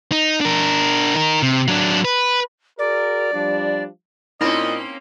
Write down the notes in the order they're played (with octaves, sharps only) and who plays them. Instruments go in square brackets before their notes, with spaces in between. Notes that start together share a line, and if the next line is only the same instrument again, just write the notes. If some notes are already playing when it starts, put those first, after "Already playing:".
[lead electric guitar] D#4
D4 A#4
D#4 A#4
C3
F#3 D4
B4
[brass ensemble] F#4 G#4 A#4 [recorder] D5
[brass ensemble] F3 G3 D4
[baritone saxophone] A#2 [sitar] A#3 C4 C#4 [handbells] D#4 E4 B5 [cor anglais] D#5